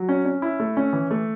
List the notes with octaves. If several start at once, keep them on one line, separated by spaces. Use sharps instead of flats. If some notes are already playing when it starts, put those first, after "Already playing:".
Already playing: F#3
C#4
C#4
E4
A3
C#4
E3
A3